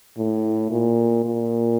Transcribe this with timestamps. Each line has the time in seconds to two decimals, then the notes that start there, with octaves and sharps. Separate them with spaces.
0.18 A2
0.71 A#2
1.25 A#2